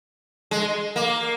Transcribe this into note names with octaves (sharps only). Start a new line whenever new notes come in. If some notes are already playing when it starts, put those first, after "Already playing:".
G#3
A#3